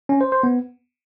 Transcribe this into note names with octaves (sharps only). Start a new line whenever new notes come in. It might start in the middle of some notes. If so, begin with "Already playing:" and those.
C#4
C5
C5
B3